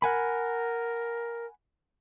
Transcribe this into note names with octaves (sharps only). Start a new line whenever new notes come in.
A#4 F#5 G#5 B5